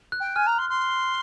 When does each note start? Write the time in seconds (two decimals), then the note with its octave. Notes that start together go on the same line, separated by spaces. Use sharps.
0.12 F#6
0.20 G5
0.36 G#5 F6
0.47 A#5
0.58 C6
0.69 C6